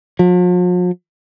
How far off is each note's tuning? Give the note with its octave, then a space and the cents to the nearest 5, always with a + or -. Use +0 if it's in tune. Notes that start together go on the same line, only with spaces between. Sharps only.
F3 +45